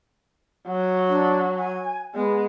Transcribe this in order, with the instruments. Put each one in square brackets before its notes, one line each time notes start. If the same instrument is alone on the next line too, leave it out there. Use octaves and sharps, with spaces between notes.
[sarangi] F#3
[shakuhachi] D4
G#5
[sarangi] G#3 [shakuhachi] B3